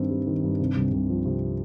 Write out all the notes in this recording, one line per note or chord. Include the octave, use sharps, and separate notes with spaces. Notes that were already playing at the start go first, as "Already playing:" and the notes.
Already playing: G2 D#3 C4
G3
D#3
G2
C3
C2
C2
F3
C3